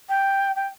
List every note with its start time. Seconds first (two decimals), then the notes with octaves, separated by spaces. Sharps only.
0.09 G5
0.55 G5